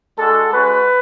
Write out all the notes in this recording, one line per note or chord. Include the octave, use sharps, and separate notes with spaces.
G#3 D4 F#4 A4
G#3 C#4 F#4 B4